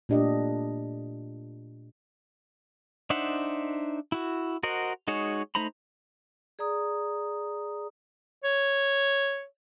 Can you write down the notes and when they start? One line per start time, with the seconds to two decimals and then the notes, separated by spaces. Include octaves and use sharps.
0.09 A#2 A3 D4 G4 D#5
3.10 D4 D#4 C5 E5 F#5
4.12 E4 F#4
4.63 F#4 A#4 C5 D#5 F#5
5.08 G#3 D#4 F#4 G#4 C#5
5.55 A3 D#4 C5 A#5 B5
6.59 G#4 D5 A#5 D#6
8.44 C#5